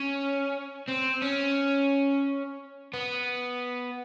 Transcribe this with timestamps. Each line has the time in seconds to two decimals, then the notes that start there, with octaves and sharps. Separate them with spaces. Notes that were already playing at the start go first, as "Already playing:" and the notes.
Already playing: C#4
0.88 C4
1.22 C#4
2.93 B3